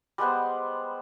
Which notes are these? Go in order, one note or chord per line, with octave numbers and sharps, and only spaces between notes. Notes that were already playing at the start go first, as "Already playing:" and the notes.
G3 G#3 B3 C5